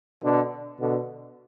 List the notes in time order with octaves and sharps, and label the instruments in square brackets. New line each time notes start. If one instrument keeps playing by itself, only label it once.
[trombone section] B2 D3
B2 D3